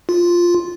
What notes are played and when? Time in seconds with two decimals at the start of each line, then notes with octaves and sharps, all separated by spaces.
0.09 F4